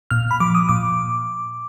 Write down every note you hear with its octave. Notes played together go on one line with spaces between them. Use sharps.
A#2 F6
B5
F3 D6
D#6
A#2 D6